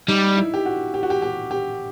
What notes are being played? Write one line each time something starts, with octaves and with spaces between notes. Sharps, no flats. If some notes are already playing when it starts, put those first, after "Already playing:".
G3 D#4
E4
G4
F#4
G4
F#4
G4
G4
G4